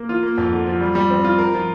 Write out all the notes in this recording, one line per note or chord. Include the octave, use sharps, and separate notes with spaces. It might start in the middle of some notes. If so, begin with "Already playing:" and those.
Already playing: A#3
F4
A#3
F2
D3
F3
G3
G3
C4
F4
A#4
F3